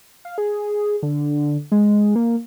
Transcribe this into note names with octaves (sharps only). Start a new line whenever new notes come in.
F5
G#4
D3
G#3
A#3